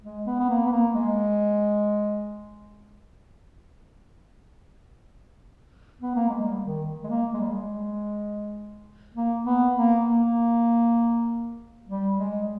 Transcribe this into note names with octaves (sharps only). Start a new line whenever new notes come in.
G#3
B3
B3
A#3
B3
A#3
G#3
B3
A#3
G#3
G3
D#3
G#3
A#3
G#3
G3
G#3
A#3
B3
A#3
A#3
G3
G#3